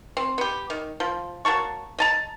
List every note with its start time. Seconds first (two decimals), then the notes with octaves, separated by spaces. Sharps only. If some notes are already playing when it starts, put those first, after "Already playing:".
0.17 C4
0.38 B3 G4
0.70 D#3
1.00 F3
1.45 F#3 A#3 A5 C#6
1.99 D#5 A5 A#5